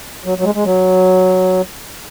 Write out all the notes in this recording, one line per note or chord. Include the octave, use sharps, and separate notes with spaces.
F#3
F#3
G#3
G#3
F#3